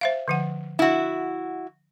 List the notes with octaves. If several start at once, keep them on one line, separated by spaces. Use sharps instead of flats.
C5 E5 F5
D3 F3 F#5
E4 F#4